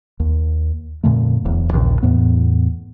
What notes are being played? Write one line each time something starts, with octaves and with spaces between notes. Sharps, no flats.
D#2
F2 A#2 D3 A3
D1 E2
A#1 D#2 A#2 C#3
E2 A2 B3